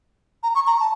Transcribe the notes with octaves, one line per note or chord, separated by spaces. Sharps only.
A#5
C#6
A#5
A5